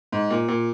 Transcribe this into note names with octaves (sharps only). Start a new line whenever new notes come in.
G#2
A#2
A#2